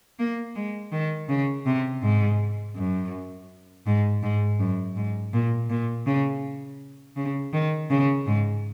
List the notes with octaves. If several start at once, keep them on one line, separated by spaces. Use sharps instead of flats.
A#3
G#3
D#3
C#3
C3
G#2
F#2
G#2
G#2
F#2
G#2
A#2
A#2
C#3
C#3
D#3
C#3
G#2